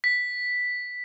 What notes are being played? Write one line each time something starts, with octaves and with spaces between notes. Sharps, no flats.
B6